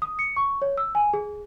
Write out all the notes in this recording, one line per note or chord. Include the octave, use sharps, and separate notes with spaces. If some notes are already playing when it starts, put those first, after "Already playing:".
D#6
C#7
C#6
C#5
E6
G#5
G#4